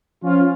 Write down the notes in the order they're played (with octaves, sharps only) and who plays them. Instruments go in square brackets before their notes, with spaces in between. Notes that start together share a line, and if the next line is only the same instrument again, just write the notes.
[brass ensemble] F3 C#4 F4